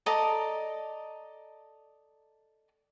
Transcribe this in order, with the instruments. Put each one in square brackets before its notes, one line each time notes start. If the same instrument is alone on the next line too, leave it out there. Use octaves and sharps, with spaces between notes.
[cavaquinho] A4 D5 D#5 A#5